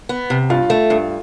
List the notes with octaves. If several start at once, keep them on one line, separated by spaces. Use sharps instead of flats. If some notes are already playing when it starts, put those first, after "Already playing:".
B3
C3
G2 F4 F5
A3
G2